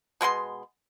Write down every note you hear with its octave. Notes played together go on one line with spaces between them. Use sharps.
B2 G#3 B3 C6